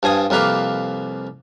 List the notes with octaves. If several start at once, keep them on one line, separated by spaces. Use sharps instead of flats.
G2 F3 G#5 D#6
C2 F2 A#3 B4 F5 D6